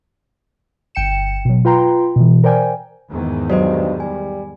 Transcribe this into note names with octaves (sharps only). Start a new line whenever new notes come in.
G1 G5 C#7 E7
B2 F#3
F4 B4 G5 A#5 C6
B2 E3
A#4 C5 D5 G5 G#5
E2 G#2 D#3
G2 F#3 F#4 C5 D#5
G3 G#5